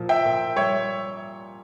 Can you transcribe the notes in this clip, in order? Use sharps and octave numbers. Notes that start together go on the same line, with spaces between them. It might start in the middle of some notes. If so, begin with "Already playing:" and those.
Already playing: A#2 F3 E4
E5 G5
A#2
G3 C#5 E5